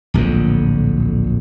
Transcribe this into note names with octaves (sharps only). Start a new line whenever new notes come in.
D1 A#1 F2 D3